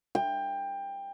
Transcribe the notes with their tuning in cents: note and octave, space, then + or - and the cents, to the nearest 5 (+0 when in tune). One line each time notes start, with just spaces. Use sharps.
G5 +20